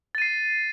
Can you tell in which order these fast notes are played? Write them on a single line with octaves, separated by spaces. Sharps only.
A6 D#7 C7